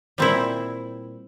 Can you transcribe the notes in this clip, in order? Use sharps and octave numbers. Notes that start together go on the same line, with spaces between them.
A#2 G3 C4 E4